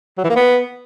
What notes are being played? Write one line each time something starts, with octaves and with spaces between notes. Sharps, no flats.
F#3
E3
A#3
B3